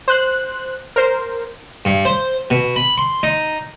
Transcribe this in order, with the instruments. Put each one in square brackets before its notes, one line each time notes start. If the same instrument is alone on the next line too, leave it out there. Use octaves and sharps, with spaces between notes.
[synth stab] C5 F#6
A#4 C5
[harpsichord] G2
C5
B2
B5
C6
D#4